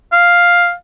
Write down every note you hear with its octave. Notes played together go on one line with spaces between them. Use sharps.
F5